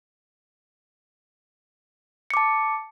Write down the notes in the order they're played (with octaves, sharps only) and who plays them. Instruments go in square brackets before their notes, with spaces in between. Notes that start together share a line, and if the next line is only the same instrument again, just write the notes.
[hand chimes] C#7
D6
A5